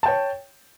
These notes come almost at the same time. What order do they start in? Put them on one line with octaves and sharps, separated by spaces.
A5 G5 C#5